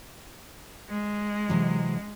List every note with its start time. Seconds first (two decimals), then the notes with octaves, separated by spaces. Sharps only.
0.89 G#3
1.49 C3 E3 F#3